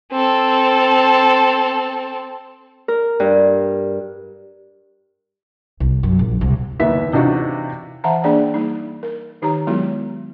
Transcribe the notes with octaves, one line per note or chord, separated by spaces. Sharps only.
C4 A4
A#4
G2
C2
F#2
A#1
C2
F#1 D#2 B3 E5 B6
C3 E3 D4 D#4 F4 F#4
E3 E5 F#5 A5 A#5
A#3 D4 G#4 D5 G5
G3 A#3 D#4
A#4
D#3 D#4 G4 C#5 A#5
F#3 G#3 B3 E4 F#4 A4